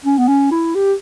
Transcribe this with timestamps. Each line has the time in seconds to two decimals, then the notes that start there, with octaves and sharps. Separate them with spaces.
0.05 C#4
0.18 B3
0.28 C#4
0.51 E4
0.75 G4